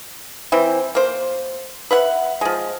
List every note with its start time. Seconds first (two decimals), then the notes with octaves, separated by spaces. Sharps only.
0.52 E3 C4 C5
0.95 A#3 C5
1.91 B4 E5 F#5
2.41 F3 G#3